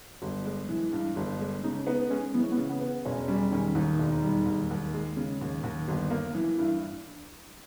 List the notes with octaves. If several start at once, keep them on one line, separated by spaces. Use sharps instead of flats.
G1
G#3
E3
G2
G1
G#3
C#3 D#4
B3 D#4
G#3 C#4
E3 B3
C#4
B3
C#3
B3
B3
E1 C#4
G3 C#4
D#3 C#4
D#2 D#4
E1
G3
D#2
D#2
G#3
C#3
D#2
D#2
G1
A#3
E3
G2 E4